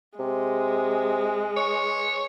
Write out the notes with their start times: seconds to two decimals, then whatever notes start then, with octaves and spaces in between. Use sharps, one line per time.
0.19 C3 G#3
1.57 C#5